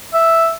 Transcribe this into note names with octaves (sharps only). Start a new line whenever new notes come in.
E5